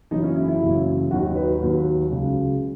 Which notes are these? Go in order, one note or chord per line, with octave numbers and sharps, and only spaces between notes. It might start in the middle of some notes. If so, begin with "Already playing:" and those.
F#1 F#2 C#3 E3 D#4
C#4
E4
E4
F#1 F#2 C#3 E3
D#2 D#3 F#3 F#4
B4
D#2 D#3 F#3
C#2 C#3 F#3